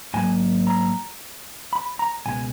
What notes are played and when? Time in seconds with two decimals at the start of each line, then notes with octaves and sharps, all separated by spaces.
0.14 G#2 F#3 A#3 G#5
0.67 A#5
1.73 B5
1.99 A#5
2.26 C#2 B2 G#3 G#5